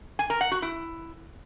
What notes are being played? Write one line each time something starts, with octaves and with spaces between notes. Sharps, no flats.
G#5
A#4
F#5
F#4
E4